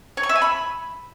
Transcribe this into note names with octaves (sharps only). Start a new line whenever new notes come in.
C#5
C#6
E5
G#5
B5